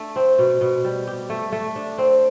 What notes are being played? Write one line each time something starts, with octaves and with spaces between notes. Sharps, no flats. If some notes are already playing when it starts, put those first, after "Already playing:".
Already playing: A3 D4
C4
B2
B2
G3
G4
A3
A3
D4
C4